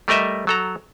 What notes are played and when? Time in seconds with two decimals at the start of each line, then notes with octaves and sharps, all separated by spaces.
0.08 G3 A3 A#4 D#5 E5
0.47 F#3 A4 A#5